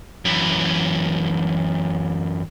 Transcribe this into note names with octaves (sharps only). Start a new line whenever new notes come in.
F#2 E3